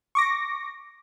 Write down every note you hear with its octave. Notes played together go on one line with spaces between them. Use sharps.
C#6 D6 A#6